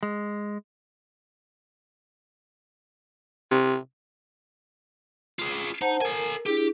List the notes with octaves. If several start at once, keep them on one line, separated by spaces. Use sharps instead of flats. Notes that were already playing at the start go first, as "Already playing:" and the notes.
G#3
C3
F4 G#4
D#4 C5 F#5 A5
A4 A#4 G#5
D4 E4 G4 G#4